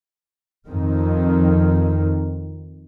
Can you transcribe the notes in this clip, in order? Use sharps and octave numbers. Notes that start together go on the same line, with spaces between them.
F2 D#3